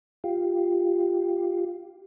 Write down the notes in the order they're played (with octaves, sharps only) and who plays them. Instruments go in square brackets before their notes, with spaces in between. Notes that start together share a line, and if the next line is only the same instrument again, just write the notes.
[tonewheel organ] F4 G4